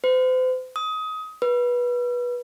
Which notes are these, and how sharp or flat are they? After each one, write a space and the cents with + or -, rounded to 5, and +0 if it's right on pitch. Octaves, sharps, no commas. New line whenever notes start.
C5 -40
D#6 +20
B4 -20